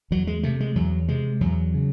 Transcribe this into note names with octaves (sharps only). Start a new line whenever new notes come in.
E2 F#3
G#3
C3 A3
G#3
E2 F#3
C3 G#3
E2 F#3
C#3